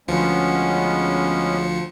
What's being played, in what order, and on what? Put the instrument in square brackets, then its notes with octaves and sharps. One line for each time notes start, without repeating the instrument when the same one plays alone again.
[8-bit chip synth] D2 F3 C#7 [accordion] G#3 B3 C#4